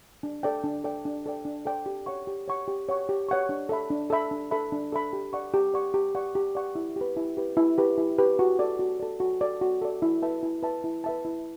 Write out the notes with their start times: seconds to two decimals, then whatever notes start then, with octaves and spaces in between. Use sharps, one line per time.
0.23 D4
0.43 A4 D5 G5
0.64 D4
0.84 A4 D5 G5
1.05 D4
1.26 A4 D5 G5
1.45 D4
1.66 A4 D5 G5
1.86 G4
2.06 C#5 F#5 C#6
2.27 G4
2.48 C#5 F#5 C#6
2.68 G4
2.89 C#5 F#5 C#6
3.09 G4
3.29 C#5 F#5 C#6
3.49 D4
3.69 A4 E5 B5
3.90 D4
4.10 A4 E5 B5
4.31 D4
4.51 A4 E5 B5
4.72 D4
4.92 A4 E5 B5
5.13 G4
5.33 D5 F#5 C#6
5.54 G4
5.74 D5 F#5 C#6
5.94 G4
6.15 D5 F#5 C#6
6.35 G4
6.55 D5 F#5 C#6
6.75 E4
6.96 G4 B4
7.17 E4
7.37 G4 B4
7.57 E4
7.78 G4 B4
7.98 E4
8.19 G4 B4
8.39 F#4
8.59 A4 D5
8.79 F#4
9.00 A4 D5
9.20 F#4
9.41 A4 D5
9.61 F#4
9.82 A4 D5
10.02 E4
10.22 B4 E5 A5
10.43 E4
10.63 B4 E5 A5
10.84 E4
11.04 B4 E5 A5
11.25 E4